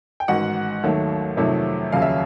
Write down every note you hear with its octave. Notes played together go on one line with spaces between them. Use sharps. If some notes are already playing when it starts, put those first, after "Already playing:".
G5
A1 G#2 D#3 F#4 F#5
D#2 D#3 F#3 A3
F2 C3 D#3 F#3 A3
F1 D#2 C#3 F#3 F5
E5